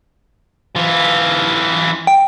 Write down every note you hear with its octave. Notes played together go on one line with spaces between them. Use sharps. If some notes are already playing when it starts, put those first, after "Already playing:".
E3 F4
G5